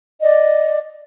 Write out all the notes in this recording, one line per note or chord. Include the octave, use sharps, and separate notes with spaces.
D5 D#5